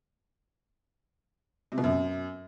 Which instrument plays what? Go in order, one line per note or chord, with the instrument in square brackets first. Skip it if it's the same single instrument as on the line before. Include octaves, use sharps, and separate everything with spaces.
[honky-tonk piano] C3
B2
F#2